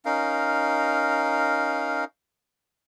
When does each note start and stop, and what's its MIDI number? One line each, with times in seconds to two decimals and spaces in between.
0.05 2.04 61
0.05 2.04 63
0.05 2.04 70
0.05 2.04 77